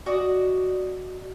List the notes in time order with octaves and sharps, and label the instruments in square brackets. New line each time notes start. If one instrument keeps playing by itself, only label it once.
[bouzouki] F#4 D5 D#5